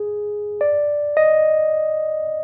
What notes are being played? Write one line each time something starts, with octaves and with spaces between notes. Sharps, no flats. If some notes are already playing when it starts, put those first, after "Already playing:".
Already playing: G#4
D5
D#5